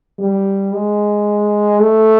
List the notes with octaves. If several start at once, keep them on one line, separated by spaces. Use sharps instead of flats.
G3
G#3
A3